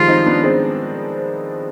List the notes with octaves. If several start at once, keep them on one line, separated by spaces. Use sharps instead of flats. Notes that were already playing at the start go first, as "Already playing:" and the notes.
Already playing: D#3 F3 G3 G#3 F4
C4 D#4
B3 D4
G#3 C4